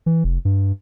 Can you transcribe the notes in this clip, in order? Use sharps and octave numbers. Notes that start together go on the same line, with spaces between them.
E3
F1
G2